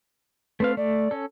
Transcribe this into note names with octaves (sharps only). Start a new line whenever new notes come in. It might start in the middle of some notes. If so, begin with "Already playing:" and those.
A3 C4 B4 F5
A3 D5
C#4 A4